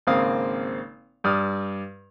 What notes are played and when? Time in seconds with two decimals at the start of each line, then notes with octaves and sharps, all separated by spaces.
0.07 G#1 C#3 A#3 C4 F5 D#6
1.24 G2 D5 D#6 F6